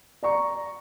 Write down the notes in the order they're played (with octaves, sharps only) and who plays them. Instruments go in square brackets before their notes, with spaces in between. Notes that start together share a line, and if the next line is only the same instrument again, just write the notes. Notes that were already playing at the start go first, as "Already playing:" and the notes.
[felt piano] D5 A#5 C#6